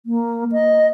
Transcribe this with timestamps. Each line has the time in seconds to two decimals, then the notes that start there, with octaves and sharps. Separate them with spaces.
0.06 A#3
0.52 D#5